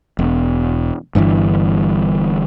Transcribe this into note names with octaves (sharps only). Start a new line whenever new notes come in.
E1
G1 G2 C3 E3